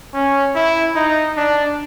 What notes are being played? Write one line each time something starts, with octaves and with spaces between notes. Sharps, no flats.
C#4
E4
D#4
D4